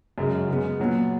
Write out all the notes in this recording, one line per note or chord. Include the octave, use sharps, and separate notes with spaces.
F#2 C#3 G#3
C#3 G#3 B3
A#2 F#3 B3